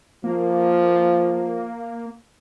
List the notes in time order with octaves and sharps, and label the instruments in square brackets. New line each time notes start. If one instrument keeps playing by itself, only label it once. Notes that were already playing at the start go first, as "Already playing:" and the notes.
[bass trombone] F3 [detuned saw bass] A#3